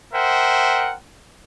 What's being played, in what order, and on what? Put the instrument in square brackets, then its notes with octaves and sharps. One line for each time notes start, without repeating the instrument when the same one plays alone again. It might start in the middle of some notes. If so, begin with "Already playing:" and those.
[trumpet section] A#4 C5 E5 F#5 G5